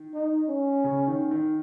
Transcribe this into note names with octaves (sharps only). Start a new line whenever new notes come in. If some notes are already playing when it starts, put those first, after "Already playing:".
Already playing: D#3
D#4
C#4
C#3
D#3
D#3